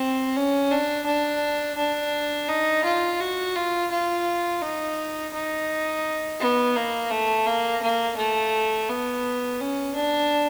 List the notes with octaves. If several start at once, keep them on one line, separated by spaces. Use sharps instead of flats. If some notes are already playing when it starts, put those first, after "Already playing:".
Already playing: C4
C#4
D4
D4
D4
D#4
F4
F#4
F4
F4
D#4
D#4
B3
A#3
A3
A#3
A#3
A3
B3
C#4
D4